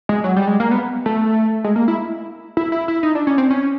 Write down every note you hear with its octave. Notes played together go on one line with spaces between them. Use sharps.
G#3
F#3
G3
G#3
A#3
B3
A3
G#3
A#3
E4
E4
E4
E4
D#4
D4
C#4
C4
C#4